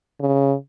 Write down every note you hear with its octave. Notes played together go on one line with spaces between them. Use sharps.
C#3